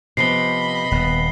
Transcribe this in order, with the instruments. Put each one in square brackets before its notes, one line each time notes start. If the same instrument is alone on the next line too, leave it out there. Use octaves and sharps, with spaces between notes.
[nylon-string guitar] C3 F3 B3 [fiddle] D#5 B5 [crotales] C7 G7
[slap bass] D#1 [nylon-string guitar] B3